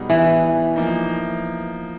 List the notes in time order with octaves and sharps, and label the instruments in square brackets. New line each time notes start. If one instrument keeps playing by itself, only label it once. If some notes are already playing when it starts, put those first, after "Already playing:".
Already playing: [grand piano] B2 G3 B3 D#4 G#4
[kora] E3
[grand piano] F3 A#3 D#4